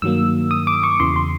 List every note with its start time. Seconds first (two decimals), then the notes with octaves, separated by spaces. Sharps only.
0.02 G2 D#3 F#3 A#3 E6
0.51 D#6
0.67 D6
0.83 C#6
1.00 E2 C#3 E3 C6
1.16 C6